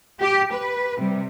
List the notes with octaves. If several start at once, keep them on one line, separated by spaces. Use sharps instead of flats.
G4
B4
C3 G3